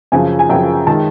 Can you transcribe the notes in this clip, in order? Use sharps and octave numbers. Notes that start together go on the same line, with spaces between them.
F#2 C#3 F3 G#5
G#5
F#2 C#3 F3 G5
D#3 G#3 A5